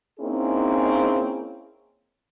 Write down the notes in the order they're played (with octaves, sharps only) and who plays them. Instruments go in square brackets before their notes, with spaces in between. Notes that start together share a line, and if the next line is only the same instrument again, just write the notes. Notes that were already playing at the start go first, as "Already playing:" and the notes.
[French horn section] A#3 C4 C#4 D#4 E4 G#4